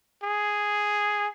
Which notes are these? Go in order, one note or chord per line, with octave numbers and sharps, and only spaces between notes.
G#4